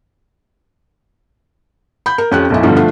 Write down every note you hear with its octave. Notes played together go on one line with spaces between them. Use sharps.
B5 G6
A#4
F2 C#4 G4 F#6
B1 F#2 E4
G2 B2 D3 F3 G3
F3 A3 D4 F4